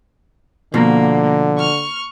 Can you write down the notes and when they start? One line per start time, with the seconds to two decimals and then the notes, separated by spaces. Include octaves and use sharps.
0.74 B2 D3 F3 A#3
1.57 C#6 F6